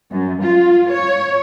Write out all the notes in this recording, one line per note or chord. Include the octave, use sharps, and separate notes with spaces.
F#2
F4
C#5